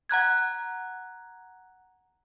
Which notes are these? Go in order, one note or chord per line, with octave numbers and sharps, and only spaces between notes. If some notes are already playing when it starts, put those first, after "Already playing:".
F#5 A#5 F#6 G#6